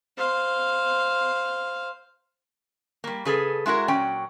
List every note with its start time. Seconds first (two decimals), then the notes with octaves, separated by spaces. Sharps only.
0.18 C5 F5
3.04 G3 A#3
3.25 C#3 G#4 A4 B4
3.66 G#3 E4 F#4 A#4
3.88 A#2 F#3 C#4 G5